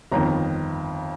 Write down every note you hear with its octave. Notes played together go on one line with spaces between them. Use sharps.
G1 F2 D#3 A#5